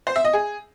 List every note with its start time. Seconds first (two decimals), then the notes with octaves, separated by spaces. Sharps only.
0.07 C5
0.16 E5
0.25 D#5
0.33 G#4